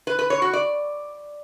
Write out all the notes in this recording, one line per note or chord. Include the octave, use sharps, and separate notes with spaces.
B4
B4
C#5
F#4
D5